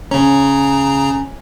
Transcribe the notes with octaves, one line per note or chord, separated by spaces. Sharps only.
C#3 C#4 A#5